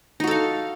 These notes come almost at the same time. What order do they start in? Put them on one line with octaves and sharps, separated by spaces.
D#4 F#4 A4 F5